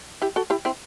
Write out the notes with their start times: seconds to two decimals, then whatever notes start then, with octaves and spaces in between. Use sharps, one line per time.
0.22 E4 G4
0.36 F#4 A4
0.50 E4 G4
0.65 C4 E4